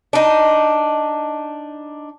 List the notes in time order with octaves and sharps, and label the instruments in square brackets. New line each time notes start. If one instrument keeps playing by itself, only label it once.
[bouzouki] D4 D#4